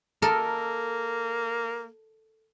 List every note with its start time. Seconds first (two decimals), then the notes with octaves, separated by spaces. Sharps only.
0.22 A#3 A4 A#4 D#5